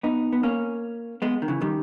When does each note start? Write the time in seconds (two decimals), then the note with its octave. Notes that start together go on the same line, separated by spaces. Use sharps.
0.03 B3 D#4
0.33 B3
0.43 A#3 C#4
1.22 G#3 B3
1.42 D#3
1.48 C#3 E3
1.61 D#3 G3